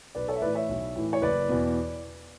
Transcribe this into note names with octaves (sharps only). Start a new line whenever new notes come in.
B1 B4 D5
A4 C#5
E5
A2 E3 B4 D5
C#5 E5
B1
A2 E3
C#5
F#1 B4 D5
E2 B2